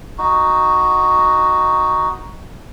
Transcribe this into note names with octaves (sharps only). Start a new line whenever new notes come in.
D#4 F#4